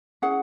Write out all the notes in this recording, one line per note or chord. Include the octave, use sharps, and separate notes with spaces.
C#4 E4 G#4 F#5